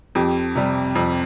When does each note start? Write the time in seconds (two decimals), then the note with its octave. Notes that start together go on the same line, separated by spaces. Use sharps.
0.15 F2 G4
0.55 C3 G3
0.95 F2